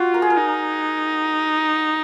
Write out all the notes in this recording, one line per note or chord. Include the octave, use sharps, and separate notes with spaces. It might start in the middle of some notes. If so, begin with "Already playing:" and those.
Already playing: F4 F#4
A#4
G#4
A#4
D#4